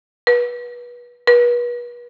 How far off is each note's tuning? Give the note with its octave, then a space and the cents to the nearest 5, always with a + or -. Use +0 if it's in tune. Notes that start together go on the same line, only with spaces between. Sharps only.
B4 -25
B4 -40